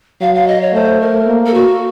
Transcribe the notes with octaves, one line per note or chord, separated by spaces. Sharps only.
F#3 F5
F5
D#5
C#5
A3 C5
A#4
A#3
A4
F#4